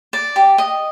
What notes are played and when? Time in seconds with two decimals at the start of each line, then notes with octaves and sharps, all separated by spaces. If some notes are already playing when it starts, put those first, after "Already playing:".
0.13 D5
0.36 G4
0.58 D#5